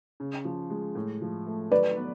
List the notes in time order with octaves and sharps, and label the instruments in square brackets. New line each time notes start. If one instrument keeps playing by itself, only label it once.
[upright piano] C#3
F3
G#3
A2
F3
A3
[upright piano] F#3 [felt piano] B4 D5
[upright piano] B3